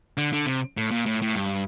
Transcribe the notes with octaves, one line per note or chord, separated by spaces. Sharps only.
D3
D3
C3
A2
A#2
A2
A2
G2